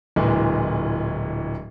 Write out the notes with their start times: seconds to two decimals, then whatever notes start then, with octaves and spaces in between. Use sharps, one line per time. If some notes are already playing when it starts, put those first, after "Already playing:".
0.16 D1 A#2 E3 G#3